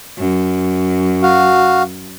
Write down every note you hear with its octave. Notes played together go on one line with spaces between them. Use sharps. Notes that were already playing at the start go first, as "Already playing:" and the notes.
F#2
F#4 F5